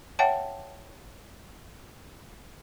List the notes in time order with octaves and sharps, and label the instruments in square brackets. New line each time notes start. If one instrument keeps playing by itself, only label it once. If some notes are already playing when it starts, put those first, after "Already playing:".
[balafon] C#5 E5 F#5 G5 A5